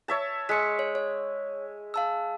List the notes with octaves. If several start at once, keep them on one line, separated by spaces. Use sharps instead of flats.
C#5 E5 A5
G#3 B6 C#7
C#5
C#5
F5 A5 E6